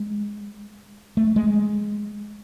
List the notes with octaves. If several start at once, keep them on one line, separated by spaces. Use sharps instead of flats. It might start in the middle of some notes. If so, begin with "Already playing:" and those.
Already playing: G#3
A3
G#3